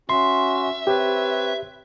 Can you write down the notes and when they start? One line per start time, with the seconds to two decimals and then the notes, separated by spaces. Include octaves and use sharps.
0.10 C#4 F#4 E5 C6
0.87 C4 G4 B4 C#5